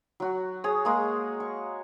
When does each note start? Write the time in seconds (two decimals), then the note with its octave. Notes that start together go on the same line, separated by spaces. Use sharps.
0.20 F#3 F#4
0.64 G#4 C#5 D#6
0.85 G#3 A#3
1.40 C#6